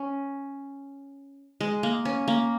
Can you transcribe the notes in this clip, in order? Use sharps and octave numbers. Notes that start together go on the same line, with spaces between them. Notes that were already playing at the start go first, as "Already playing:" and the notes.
Already playing: C#4
G#3
A#3
C#4
A#3